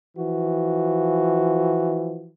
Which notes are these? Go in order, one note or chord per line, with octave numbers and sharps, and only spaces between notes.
E3 F3 F#4